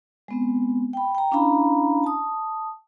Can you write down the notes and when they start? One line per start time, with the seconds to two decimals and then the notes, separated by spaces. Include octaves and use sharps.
0.28 G#3 B3 C4
0.93 G5 B5
1.15 G5 A#5
1.31 C#4 D4 E4 F5 A#5 B5
2.04 A5 D#6